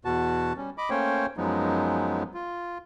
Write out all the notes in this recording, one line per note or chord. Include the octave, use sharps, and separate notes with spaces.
E2 B2 F#4 A5
G3 C#4
D#5 B5 D6
A3 A#3 C#4 C5 C#5 G5
F#2 F3 F#3 G#3 B3 D#4
F4